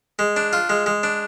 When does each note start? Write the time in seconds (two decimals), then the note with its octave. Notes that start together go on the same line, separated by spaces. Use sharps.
0.19 G#3
0.36 D4
0.53 F4
0.70 G#3
0.86 G#3
1.03 D4